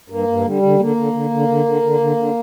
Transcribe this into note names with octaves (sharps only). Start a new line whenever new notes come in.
G2 A#3
G2
D3 G3
D3
D3 A#3
D3
D3
D3
D3
D3
D3
D3
D3